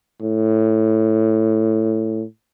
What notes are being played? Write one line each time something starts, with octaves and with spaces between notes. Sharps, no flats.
A2